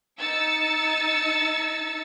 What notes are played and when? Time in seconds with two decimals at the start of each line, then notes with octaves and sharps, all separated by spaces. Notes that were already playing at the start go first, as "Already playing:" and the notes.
0.20 D#4 E6 A6 C#7